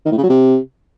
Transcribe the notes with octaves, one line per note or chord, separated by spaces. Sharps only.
D#3
A2
C#3
F#3
C3